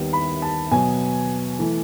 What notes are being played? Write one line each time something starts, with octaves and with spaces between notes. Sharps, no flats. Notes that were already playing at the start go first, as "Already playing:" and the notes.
Already playing: D#2 D#3 G3 B3
B5
A5
B2 F#3 B3 G#5
E3 A3